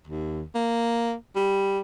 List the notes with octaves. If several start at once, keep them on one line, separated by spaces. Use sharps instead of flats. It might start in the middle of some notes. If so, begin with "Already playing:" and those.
D#2
A#3
G3